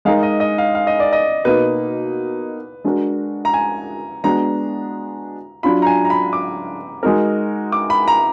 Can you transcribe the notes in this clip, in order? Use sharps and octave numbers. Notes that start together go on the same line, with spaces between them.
G#3 D#4 A#4 F5
D#5
D#5
F5
F5
D#5
D5
D#5
B2 A#3 D#4 B4
G#3 D4 F#4 A#4
A#5
G#5
G#3 B3 D4 F#4 A#5
F#3 D4 F4 B5
A#5
G#5
A#5
B5
D6
G#3 D#4 F#4 A#4
D6
B5
A#5